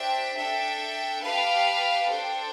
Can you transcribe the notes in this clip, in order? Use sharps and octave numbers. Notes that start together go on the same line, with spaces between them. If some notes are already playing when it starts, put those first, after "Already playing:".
Already playing: D4 G4 C5 E5 G5
D4 A4 E5 G5
G4 B4 F5 A5
D4 A4 C5 G5